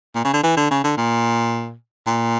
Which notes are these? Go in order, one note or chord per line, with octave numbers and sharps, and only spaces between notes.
A#2
C#3
D3
E3
D3
C#3
D3
A#2
A#2